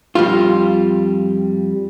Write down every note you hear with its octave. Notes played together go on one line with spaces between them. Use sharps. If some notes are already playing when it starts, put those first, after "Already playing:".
F2 G3 F4